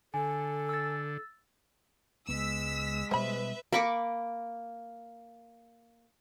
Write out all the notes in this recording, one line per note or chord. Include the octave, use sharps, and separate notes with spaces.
D3 A4 G#5
E6 A6
C#2 G#3 B3 E6 B6
B2 G3 B4 C5 E5 B5
A#3 B5 C#6 D6